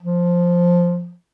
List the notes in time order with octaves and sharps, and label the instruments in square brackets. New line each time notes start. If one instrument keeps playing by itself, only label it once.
[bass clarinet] F3